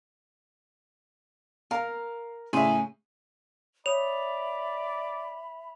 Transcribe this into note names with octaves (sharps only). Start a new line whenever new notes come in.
A#4 F5 A#5
A2 C#3 G#4 E5 C6
C#5 D5 E5 B5 D#6 F7